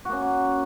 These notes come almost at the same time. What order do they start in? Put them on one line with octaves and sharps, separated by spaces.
F#4 A#3 C#4